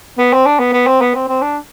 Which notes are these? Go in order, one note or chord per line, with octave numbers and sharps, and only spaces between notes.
B3
C4
D4
B3
B3
C4
B3
C4
C4
D4